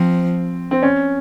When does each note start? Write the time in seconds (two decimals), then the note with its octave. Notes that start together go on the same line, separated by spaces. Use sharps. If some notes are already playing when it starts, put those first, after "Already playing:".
Already playing: F3 C4
0.71 C4
0.82 C#4